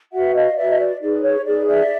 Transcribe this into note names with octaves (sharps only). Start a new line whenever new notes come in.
F#4 B4 E5 F#5
D#5 F5
F#4 B4 D5 E5
D#5
D5
D#4 G#4 B4 D5
C#5
D#4 G#4 B4 D5
D5 E5